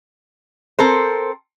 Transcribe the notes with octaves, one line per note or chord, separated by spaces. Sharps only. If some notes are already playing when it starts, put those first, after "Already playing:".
C4 A4 A#4 C5